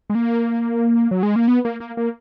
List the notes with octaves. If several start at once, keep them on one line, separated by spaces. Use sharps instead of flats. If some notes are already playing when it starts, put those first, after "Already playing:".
G#3
A#3
F#3
G#3
A#3
B3
A#3
A#3
A#3